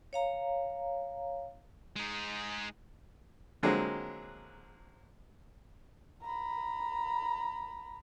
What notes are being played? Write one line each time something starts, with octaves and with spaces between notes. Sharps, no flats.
C#5 F5 A#5
G#3 D#4
D3 F3 F#3 G#3 A#3 C4
A#5 B5